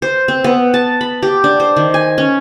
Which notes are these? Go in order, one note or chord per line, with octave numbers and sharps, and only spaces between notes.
C5
C4
B3
A5
B5
G4
D4
C5
D#3
G#5
C#4